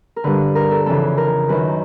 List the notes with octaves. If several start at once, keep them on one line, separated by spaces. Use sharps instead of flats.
A#4
G2 D3 B4
A#4
A4
F2 C#3 E3 A4
A#4
F#2 D#3 B4